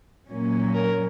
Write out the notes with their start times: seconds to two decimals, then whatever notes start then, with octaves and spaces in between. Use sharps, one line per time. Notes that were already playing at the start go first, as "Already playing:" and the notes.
0.28 A#2 F#3 A#3 C#4
0.74 A#4